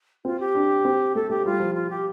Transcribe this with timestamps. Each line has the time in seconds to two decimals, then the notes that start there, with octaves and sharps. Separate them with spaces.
0.25 C4 F4
0.40 G4
0.55 D4
0.85 C4
1.15 A3 A4
1.30 A3 G4
1.45 G3 F4
1.60 F3
1.75 F4
1.90 G4